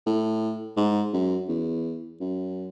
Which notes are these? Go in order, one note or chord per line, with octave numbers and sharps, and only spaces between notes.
A2
G#2
F#2
E2
F#2